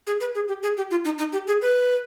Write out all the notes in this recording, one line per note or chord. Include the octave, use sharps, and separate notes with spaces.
G#4
B4
G#4
G4
G#4
G4
F4
D#4
D#4
G4
G#4
B4